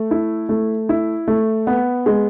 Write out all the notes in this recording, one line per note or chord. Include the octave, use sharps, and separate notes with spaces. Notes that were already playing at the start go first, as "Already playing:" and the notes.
Already playing: A3
E4
A3
E4
A3
B3
G#3